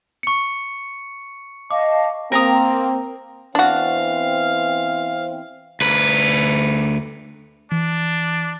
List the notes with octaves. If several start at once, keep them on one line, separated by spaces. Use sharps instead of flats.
C#6 C#7
D#5 F5 A5 D6
A#3 C4 A#4 A#5 D#6
E3 B3 C4 D4 F#4 F5
D2 B4
E3 D4